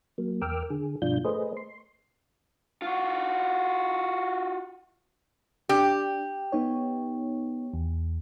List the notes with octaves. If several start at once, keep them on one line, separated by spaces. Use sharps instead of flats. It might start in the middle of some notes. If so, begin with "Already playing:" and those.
F#3 A#3
E2 A#4 G5 D6 E6 F6
D3 G#4
G2 B2 F3 D4 F4 G6
A3 G#4 B4 C5 D#5
C6
F4 F#4
D4 G4
B3 D#4 C#5
E2